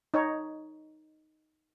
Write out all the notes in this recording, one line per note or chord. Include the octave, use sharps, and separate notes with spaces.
D#4 C#5